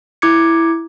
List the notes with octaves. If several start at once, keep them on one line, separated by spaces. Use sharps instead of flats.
E4 D6 G#6 C#7